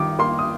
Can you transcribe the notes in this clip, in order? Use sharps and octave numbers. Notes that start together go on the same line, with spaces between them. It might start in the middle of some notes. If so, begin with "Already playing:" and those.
Already playing: D#3 G3 D6
A#3 C6
D#6